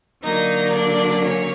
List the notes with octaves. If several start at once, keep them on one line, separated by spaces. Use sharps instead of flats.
D3 F#3 A#3 D#4 D#5
D4 D5
C#4 C#5